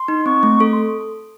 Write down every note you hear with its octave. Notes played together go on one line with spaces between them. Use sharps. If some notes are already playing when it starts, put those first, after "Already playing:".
Already playing: C6
D#4
C4 C#6
A3
A4
C6